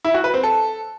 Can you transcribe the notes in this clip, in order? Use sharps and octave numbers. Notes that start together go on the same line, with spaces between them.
E4
F#4
B4
C4
A4